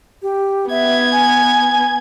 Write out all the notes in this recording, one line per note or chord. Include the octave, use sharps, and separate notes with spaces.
G4
B3 E5 G#6
G#5